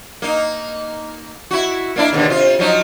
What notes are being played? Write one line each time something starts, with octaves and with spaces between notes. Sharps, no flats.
A#3 D#4
E4 F#4
A#3 D4 E4
D#2 B2 D3
C3 F4
F3 F#3 D#4